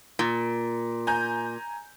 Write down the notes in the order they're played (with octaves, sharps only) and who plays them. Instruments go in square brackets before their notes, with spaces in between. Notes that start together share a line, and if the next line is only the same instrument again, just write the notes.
[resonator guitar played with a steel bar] A#2
[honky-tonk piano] G#5 A#5 G6